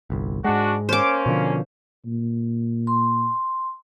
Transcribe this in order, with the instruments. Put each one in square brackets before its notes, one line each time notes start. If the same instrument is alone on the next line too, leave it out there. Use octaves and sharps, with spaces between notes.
[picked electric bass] G1 C2
[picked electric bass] G#2 G#3 [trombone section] D4 F#4
[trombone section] A#3 C#4 [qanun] C5 D6
[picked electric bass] B2 D3 F3
[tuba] A#2
[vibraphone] C6